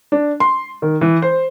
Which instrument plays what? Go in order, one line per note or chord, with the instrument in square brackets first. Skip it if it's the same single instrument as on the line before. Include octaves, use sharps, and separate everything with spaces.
[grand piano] D4
C6
D#3
E3
C5